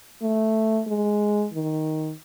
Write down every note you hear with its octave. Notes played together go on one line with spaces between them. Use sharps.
A3
G#3
D#3